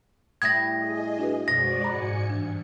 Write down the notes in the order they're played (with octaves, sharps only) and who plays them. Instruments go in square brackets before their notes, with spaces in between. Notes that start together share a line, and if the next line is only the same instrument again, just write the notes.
[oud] A2 G3 E4 [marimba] D#6 [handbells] G#6 A#6
[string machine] G#4 D#5
[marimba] D4 F#4 B4
[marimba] F#2 B2 [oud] F3 [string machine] G#3 F#4 D5 [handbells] A#6
[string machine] G#2 G#5 C#7 [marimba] A#5 B5
[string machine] G2 [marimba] E3 D4